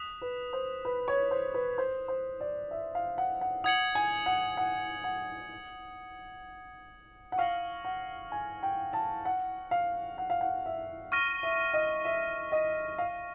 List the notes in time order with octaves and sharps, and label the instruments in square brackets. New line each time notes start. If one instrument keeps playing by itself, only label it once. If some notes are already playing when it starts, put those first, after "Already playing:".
Already playing: [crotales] D#6 F#6 B6 E7
[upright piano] B4
C5
B4
C#5
C5
B4
C5
C5
D5
E5
F5
F#5
F#5
[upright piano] F#5 [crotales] D#6 G#6 C#7 F#7
[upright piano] G#5
F#5
F#5
F#5
F#5
[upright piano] F5 [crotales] C#6 F6 A#6 C#7 F#7
[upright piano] F#5
G#5
G5
A5
F#5
F5
F#5
F5
F#5
E5
[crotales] C#6 F6 A#6 D#7
[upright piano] E5
D#5
E5
D#5
F5